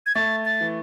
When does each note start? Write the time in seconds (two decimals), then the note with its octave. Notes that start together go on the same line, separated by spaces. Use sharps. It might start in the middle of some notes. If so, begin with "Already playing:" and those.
0.06 G#6
0.15 A3 A6
0.46 A6
0.60 E3